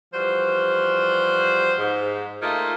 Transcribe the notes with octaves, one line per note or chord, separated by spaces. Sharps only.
E3 F3 G3 F#4 C5
G#2
A3 A#3 D#4 F4